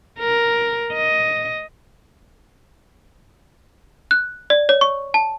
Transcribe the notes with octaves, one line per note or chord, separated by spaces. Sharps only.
A#4
D#5
F#6
D5
C#5
C#6
A5